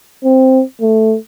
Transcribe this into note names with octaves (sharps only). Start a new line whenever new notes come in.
C4
A3